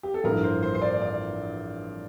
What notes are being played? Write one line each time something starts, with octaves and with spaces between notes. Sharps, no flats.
G4
A4
A1 G2 F3 A#4
C5
C5
C5
D5
D5